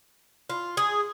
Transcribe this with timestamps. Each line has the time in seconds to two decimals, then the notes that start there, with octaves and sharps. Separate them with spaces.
0.50 F4
0.77 G#4